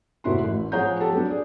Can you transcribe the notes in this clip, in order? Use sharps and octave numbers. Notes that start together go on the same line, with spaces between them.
F1 A#3 E4 F#4 C6
A1
F3 G#4 C#5 F#5 A#5 G6
G4 A4 A5
F#3 B3 D4
G#4 D5